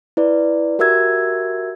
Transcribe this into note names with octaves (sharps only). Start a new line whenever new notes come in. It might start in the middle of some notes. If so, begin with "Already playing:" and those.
E4 B4 D5
F#4 G4 A#4 E5 E6 G#6